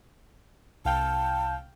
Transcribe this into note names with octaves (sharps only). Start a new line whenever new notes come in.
C2 F5 G5 A5